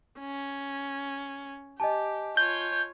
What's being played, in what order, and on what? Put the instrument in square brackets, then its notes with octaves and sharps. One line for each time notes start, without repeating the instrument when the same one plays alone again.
[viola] C#4
[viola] G4 [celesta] D#5 G#5 A5
[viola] F4 C#5 [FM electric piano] G6